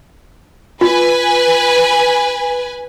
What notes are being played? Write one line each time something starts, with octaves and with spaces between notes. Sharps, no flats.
F4 B4 G#5